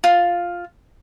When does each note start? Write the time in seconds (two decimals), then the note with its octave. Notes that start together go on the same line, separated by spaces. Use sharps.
0.04 F4